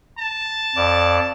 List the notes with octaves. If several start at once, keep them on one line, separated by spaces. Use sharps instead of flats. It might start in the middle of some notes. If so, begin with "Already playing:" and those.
A5
F2 D5